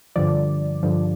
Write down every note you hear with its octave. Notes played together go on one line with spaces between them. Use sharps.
G2 D3 F3 D5
G2 D3 F3